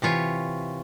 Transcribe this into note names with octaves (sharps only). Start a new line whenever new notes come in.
C3 E3 F4 C#5